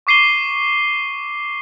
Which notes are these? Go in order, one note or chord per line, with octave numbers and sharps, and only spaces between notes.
C#6 D6 C7 D#7 G7